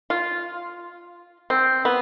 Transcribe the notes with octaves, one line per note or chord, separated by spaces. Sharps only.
F4
C4
B3